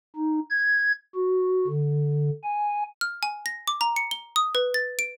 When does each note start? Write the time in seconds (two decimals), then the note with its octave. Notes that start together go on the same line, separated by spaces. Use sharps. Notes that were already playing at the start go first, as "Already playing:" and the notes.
0.16 D#4
0.50 G#6
1.15 F#4
1.68 D3
2.43 G#5
3.01 F6
3.23 G#5
3.46 A#6
3.68 D6
3.81 A#5
3.96 C#7
4.11 G7
4.36 D#6
4.55 B4
4.74 A6
4.99 D7